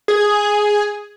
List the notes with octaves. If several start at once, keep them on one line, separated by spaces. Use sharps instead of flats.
G#4